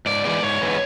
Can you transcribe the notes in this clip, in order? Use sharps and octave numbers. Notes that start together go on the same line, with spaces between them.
G#2 D5
E3 G#3 B3 D5
G#2 C#5
E3 G#3 B3